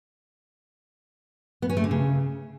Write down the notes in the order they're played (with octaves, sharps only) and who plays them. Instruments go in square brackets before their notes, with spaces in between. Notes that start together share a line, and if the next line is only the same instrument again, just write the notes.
[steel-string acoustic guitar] B3
C#4
A3
D3
C#3